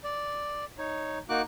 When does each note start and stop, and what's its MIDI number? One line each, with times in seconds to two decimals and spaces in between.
0.04 0.65 74
0.78 1.18 63
0.78 1.18 73
1.29 1.42 58
1.29 1.42 63
1.29 1.42 66
1.29 1.42 86
1.29 1.42 90